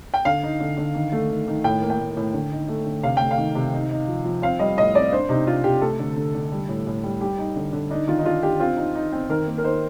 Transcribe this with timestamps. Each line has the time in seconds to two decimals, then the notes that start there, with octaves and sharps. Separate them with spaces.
0.14 G5
0.25 D3 F5
0.43 D#4
0.60 D3
0.77 D3
0.95 D#3
1.12 A3
1.29 D#3
1.48 D#3
1.64 A2 G5
1.81 A#3
1.90 G5
1.99 A2
2.17 A2
2.33 D3
2.52 D#4
2.68 A3
2.86 D3
3.03 C3 F5
3.17 A3 G5
3.31 F5
3.38 D#3
3.55 C3
3.73 D#4
3.91 D#4
4.08 F3
4.25 F3
4.42 C4 F5
4.59 G3 D#5
4.77 A2 D#5
4.94 C4 D5
5.12 D4 C5
5.29 C3 D#4
5.47 D4 F4
5.64 C3 G4
5.81 A3 A4
5.99 D3
6.16 D3
6.34 D3
6.52 G3
6.69 A2
6.87 A2
7.04 G3
7.21 G3 G4
7.38 D#4
7.56 D3
7.73 D3
7.91 D4 D#4
8.07 D#3 F4
8.19 D#4
8.25 D4 F4
8.43 D4 G4
8.60 C4 F4
8.77 D#4
8.95 D#4
9.13 C4
9.30 D#3 A#4
9.47 A#3
9.58 A#4
9.64 D#4 C5